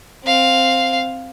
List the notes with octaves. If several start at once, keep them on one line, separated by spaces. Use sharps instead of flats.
C4 F5